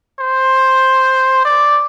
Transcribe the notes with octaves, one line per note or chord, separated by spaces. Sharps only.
C5
D5